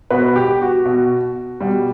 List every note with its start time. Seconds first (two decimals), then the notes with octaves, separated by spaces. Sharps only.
0.11 B2 B4
0.36 G4
0.62 F#4
0.86 B2
1.61 B2 G3